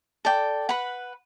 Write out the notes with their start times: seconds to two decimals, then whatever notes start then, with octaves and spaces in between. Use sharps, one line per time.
0.25 A4 D5 G5
0.69 B4 F#5 B5